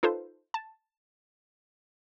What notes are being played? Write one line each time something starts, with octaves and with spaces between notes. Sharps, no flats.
D#4 F4 A4 B4 C5
A5